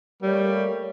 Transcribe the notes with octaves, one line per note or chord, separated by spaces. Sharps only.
G3 A3 A#3 C#5